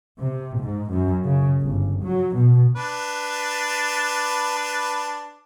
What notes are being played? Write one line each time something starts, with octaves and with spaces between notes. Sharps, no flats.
C3
G#2
F#2
C#3
G1
F#3
B2
D4 B4